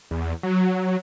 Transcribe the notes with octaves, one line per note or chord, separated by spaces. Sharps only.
E2
F#3